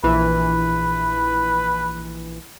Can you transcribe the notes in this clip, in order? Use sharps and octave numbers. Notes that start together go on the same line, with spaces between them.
A#1 E3 B4